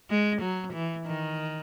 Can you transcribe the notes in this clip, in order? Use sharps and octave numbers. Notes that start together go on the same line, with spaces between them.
G#3
F#3
E3
D#3